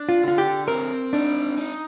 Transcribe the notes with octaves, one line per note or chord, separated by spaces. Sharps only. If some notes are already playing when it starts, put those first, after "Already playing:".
Already playing: D4
F4
D3 F4
G4
C4 A#4
D4 D#4
D#4